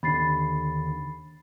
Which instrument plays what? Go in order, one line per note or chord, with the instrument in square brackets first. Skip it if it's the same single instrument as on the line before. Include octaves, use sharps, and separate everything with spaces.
[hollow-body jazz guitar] D#2 D3 [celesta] B5 A6 C7